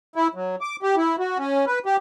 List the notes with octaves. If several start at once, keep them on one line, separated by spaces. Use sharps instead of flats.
E4
F#3
D6
G4
E4
F#4
C#4
B4
G4